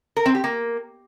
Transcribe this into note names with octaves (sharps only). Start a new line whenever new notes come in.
A#4
C4
G4
A#3